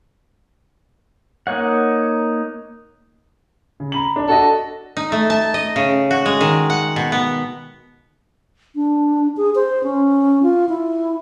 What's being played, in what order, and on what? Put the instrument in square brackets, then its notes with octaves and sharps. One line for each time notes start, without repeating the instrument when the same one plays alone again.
[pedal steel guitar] A#3 D#4 C#5 F#5
[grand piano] C#3
A#5 B5 F#7
D4
[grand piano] D4 F#4 D#5 [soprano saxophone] A4
[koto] D#4
A3
A5
D#5
C#3
F#4
G#3
D#3
F#5
B2
B3
[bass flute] D4
G#4
C5
C#4
F4
E4